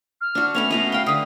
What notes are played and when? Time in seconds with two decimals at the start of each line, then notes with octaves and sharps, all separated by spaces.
0.21 F6
0.35 D4 F#4
0.54 A3 B3 C#4 F7
0.70 B2 B3 D#5 F7
0.92 F5 G5 C6
1.06 D3 B4 D#6